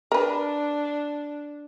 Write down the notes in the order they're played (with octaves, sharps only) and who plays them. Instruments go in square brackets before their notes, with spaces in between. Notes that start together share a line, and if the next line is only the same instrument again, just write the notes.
[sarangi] D4 [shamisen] A#4 B4